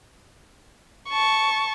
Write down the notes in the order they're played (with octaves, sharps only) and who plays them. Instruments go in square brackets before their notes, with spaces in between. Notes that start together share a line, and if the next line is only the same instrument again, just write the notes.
[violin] A5 C#6